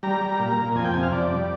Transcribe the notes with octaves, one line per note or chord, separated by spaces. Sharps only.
G3 A#5
G3
A#2
A#2
F2 G#5
G5
C3 G#5
F5
F2 D5
G3